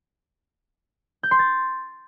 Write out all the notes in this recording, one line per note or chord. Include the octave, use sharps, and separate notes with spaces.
G6
C6
A6